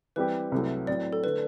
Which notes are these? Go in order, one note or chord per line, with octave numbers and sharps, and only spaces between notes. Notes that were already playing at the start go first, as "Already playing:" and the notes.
E3 G3 C4 G4 B4
C2 C3 F#3 A3
A2 F#3 C4 D5
A4
D3 A3 B4